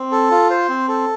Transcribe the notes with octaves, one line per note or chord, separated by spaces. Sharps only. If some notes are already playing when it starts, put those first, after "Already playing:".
Already playing: C4
A4
F4
C5
C4
A4